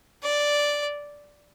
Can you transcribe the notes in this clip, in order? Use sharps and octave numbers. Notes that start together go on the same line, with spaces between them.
D5